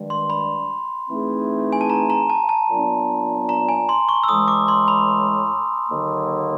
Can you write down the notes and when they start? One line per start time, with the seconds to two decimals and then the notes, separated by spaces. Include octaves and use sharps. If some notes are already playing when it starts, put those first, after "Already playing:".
Already playing: G2 D#3 G#3
0.10 C6
0.30 B5
1.10 E3 A3 C4 D#4 G#4
1.73 G#5
1.81 A5
1.90 A#5
2.10 A#5
2.30 A5
2.49 A5
2.69 A#2 F#3 B3 D4
3.49 A#5
3.69 G#5
3.89 C6
4.09 C#6
4.23 E6
4.29 A2 E3 G#3 D#6
4.48 D6
4.68 C6
4.88 B5
5.88 D#2 D3 F#3 A#3